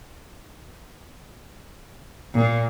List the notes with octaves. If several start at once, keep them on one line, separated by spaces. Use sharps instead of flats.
A#2